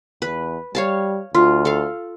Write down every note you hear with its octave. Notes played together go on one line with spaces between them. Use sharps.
E2 B4
G3 C#5 F5 A5
D2 F4
A4 F5